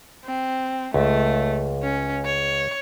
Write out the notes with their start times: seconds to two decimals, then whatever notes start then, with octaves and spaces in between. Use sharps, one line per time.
0.25 C4
0.94 C#2 A3
1.83 C#4
2.25 C#5